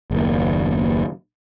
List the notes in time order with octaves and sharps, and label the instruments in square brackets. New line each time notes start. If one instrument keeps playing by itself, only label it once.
[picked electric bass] F#1 D#2